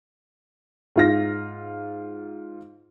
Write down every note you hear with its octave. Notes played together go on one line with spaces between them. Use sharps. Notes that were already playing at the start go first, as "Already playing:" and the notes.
G#2 F4 A#6